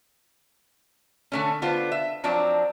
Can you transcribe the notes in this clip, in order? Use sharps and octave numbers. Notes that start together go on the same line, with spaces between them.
D3 A3 C#4
D3 B3 F4 C5
E5
F3 F#3 C4 D4 D5